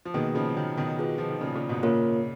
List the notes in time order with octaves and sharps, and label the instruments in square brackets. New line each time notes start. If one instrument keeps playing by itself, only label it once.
[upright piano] F3
[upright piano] B2 D#3 [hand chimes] A#3 D#4 G#4 B4
[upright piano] C#3 F3
D#3 F#3
B2 D#3
[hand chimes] F4 G#4 B4
[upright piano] F3
D#3
A#2 C#3
A#2 C#3
G#2 B2
[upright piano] A#2 C#3 [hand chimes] A#3 F4 A#4 C#5